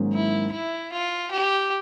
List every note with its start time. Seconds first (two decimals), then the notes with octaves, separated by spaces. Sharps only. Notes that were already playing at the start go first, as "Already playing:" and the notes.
Already playing: G#2 D#3 F#3 A#3 C#4
0.13 E4
0.53 E4
0.92 F4
1.31 G4